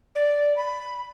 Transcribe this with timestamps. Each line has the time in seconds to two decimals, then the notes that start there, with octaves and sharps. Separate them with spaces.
0.15 D5
0.57 B5